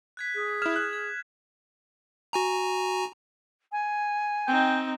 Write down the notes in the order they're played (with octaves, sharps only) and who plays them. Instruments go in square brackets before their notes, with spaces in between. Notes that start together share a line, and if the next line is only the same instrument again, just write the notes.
[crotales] F#6 G#6 B6
[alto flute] G#4
[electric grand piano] E4 F6 [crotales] G#6 E7
[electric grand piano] F#6
[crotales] G#6
[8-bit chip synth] F#4 G#5 A#5
[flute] G#5
[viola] C4 D#4 [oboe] G5